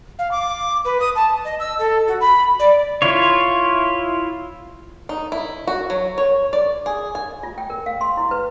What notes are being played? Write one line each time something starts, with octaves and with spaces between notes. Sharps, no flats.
F5
D6
B4
D#6
A5
D#5
E6
A4
F#4
B5
D5
E4 F4 C#5
D#4
E4
F#4
F#3
C#5
D5
G#4
G#5
F4
G5
A#4
F5
C6
E4
B4